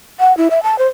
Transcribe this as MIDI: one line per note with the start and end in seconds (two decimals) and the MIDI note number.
0.20 0.35 78
0.37 0.48 64
0.51 0.63 76
0.63 0.78 81
0.78 0.86 72